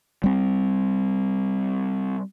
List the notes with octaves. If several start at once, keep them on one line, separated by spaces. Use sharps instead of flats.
G3 C4